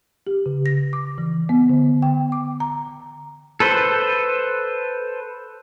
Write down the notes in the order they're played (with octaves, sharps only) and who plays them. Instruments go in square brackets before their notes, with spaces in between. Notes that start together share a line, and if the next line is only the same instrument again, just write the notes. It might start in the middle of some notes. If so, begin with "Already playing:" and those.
[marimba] G4
C#3
A#6
D6
E3
B3
D3
G5
D6
A#5
[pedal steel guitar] A4 B4 C5